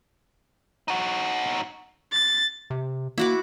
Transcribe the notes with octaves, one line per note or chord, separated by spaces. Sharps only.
D#4 F#4
A6
C3
A#3 E4 F#4 D6